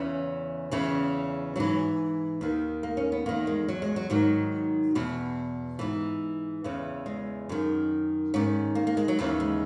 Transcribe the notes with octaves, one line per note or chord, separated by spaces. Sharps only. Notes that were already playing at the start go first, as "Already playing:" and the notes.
Already playing: E2 C#3 E3 C#4
E2 C#3 E3
G#2 E3 F#3
D#2 D#3
A#3
C#4
B3
E2 D#3 A#3
G#3
F#3
G#3
F#3
G#2 D#3 F#3
E2 B2
G#2 E3
E2 C#3 E3
G#3
F#2 D#3
G#2 D#3 C#4
A#3
A#3
G#3
F#3
D#2 C#3 E3
G#3